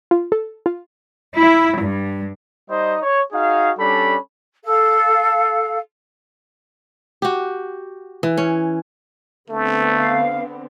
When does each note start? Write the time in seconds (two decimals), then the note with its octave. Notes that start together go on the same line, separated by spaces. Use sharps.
0.11 F4
0.32 A4
0.66 F4
1.37 E4
1.78 G2
2.69 G3 D#4 C5 D#5
3.02 C#5
3.33 D#4 F#4 G#4 F5
3.79 G3 C#4 D4 A4 B5
4.64 A4 F5
7.22 F#4 G4
8.23 E3
8.37 C#4
9.49 D3 A3 B3 C4
9.97 F5